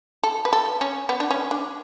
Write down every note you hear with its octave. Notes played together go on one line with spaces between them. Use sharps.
A4
B4
A4
C#4
B3
D4
C#4
D4